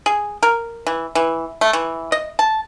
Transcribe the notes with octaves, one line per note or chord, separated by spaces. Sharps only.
G#4
A#4
E3
E3
A3
E3
D#5
A5